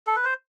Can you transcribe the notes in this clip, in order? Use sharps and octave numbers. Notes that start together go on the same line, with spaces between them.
A4
B4
C5